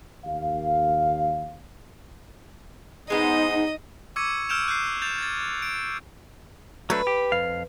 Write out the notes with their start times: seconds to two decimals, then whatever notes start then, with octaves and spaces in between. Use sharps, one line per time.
0.25 D#2 F5
3.10 G#3 B3 D#4 C5 D#5
4.16 C#6 D6 E6 G#6 C#7 D#7
4.49 E6 F6 G6 D7 E7 F7
4.68 F#6 G6 C7
5.02 G6 A6 F7
5.18 G#6 A6
5.62 D7
6.90 F#3 A3 D4 B4
7.07 G4
7.32 F2 F5